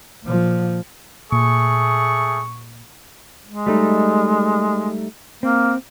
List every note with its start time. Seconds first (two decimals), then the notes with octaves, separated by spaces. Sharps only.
0.25 A#2 F3
1.32 A#2 A3 G#4 C#6
3.47 G#3
3.67 G3 A3 D#4
5.43 A#3 C4